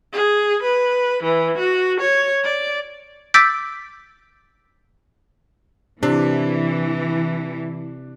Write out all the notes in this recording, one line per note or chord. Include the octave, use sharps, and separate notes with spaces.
G#4
B4
E3
F#4
C#5
D5
D6 E6 G6 A6 B6 D7
C3 E3 D4